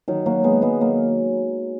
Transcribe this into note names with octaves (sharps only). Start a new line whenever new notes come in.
D#3 F#3
F#3 A#3
G#3 B3
G#3 B3
F#3 A#3